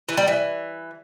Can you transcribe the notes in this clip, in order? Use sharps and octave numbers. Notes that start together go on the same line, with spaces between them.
E3
G3
E3